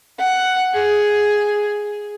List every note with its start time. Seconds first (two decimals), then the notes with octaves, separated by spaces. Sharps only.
0.19 F#5
0.74 G#4